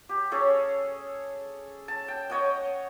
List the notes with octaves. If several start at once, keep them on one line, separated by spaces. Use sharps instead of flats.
G4
C#4 G#4 A4 C#5
A5
G5
C#5 D#5 F#5 G5